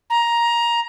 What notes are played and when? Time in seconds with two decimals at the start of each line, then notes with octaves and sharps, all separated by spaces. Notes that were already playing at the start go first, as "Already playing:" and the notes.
0.10 A#5